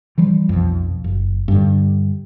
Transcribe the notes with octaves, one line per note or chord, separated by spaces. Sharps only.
E3 F3 G3
B1 F2
F#1
G2 D3